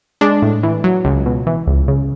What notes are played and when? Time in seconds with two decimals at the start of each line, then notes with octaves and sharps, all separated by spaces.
0.21 G#3 D4
0.42 A2
0.63 E3
0.84 F#3
1.05 C#2
1.26 B2
1.47 E3
1.67 C#2
1.88 C#3